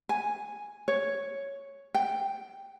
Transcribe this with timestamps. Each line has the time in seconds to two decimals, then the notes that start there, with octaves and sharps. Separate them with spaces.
0.09 G#5
0.88 C#5
1.94 G5